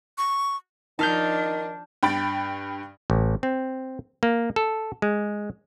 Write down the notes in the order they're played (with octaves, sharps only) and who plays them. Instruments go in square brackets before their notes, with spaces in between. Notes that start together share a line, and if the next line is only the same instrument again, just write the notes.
[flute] C#6
[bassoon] D#3 [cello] F3 D4 [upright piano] D#4 [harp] A5 F6 G6
[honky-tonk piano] G2 G5 B5 A6 D7
[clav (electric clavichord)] A1
C4
A#3
A4
G#3